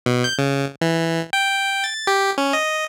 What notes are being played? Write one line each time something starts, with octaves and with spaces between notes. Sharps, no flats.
B2
G6
C#3
E3
G5
A6
G4
C#4
D#5